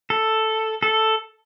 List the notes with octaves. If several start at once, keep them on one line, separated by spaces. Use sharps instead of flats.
A4
A4